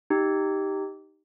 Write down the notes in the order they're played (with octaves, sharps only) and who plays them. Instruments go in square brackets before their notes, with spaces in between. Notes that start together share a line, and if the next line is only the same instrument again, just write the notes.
[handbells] D#4 G4